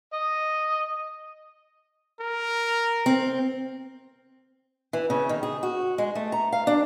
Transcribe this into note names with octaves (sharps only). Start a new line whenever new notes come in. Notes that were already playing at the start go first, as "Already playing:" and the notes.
D#5
A#4
C4
E3
C#3
D#3
G#4
F#4
G#3
A3
A#5
F5
D4